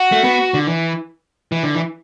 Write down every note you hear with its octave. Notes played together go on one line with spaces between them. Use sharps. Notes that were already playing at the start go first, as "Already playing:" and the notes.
Already playing: F#4
A3
B3
D3
E3
E3
D3
E3